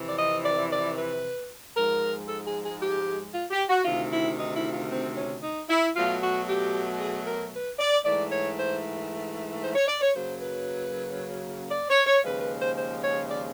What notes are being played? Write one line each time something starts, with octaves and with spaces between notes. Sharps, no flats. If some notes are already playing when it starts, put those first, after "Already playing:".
Already playing: F2 C3 E3
D5
D#5
D5
D5
B4
G#2 F3 G#3 A#4
A4
G#4
G#4
G4
F4
G4
F#4
D2 C3 D#3 F4
E4
D#4
E4
F4
C4
C#4
D#4
E4
B2 F#3 A3 F4
F#4
G4
G#4
A#4
B4
D5
G#2 E3 A3 D5
C#5
C5
C5
C#5
D5
C#5
F#2 C#3 F#3 A#3 C5
B4
D5
C#5
C#5
D#2 C#3 F3 G#3 B4
B4
C5
C5
C#5
D5